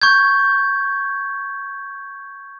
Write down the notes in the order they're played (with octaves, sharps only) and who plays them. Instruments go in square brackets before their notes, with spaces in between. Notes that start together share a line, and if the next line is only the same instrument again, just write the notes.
[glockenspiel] C#6 G6 G#6